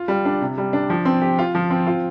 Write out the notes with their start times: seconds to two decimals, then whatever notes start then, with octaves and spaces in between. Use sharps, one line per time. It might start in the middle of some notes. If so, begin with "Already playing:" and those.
Already playing: F4
0.08 G3
0.25 D4
0.41 C3
0.58 G3
0.73 D4
0.90 F3
1.05 C4
1.21 G4
1.39 F4
1.55 F3
1.70 C4
1.87 F4